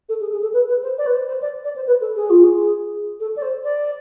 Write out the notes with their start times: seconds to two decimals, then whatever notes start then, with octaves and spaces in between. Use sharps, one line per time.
0.09 A4
0.20 G#4
0.32 G#4
0.42 A4
0.53 B4
0.68 B4
0.83 C5
0.98 D5
1.06 B4
1.13 C5
1.28 C5
1.42 D5
1.64 D5
1.76 C5
1.87 B4
2.01 A4
2.16 G#4
2.30 F4
2.44 G#4
3.20 A4
3.36 D5
3.42 C5
3.64 D5